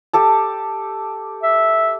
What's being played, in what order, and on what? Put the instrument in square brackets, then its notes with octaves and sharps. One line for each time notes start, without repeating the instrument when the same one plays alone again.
[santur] G4 A4 A5
[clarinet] E5